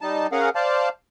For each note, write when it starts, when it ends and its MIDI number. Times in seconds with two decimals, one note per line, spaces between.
0.01 0.27 55
0.01 0.27 63
0.01 0.27 81
0.32 0.49 61
0.32 0.49 68
0.32 0.49 70
0.32 0.49 77
0.32 0.49 78
0.55 0.89 72
0.55 0.89 74
0.55 0.89 77
0.55 0.89 81